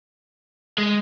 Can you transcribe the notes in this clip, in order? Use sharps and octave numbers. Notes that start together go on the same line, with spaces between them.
G#3